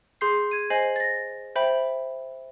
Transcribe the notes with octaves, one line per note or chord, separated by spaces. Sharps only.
G#4 C6 G6 C7
G#6 D#7
C5 D#5 G#5 C7 F#7
A6 A#6
C5 E5 G5 B5